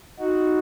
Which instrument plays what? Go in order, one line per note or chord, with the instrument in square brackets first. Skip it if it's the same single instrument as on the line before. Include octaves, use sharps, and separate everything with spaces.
[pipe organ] D#4 F#4